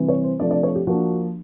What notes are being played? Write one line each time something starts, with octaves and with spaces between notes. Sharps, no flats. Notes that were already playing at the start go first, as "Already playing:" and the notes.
Already playing: C3 E3 G3 C4
C#5
C5
C3 F3 A3 D4 D5
D5
C#5
G4
F3 A#3 D4 F#4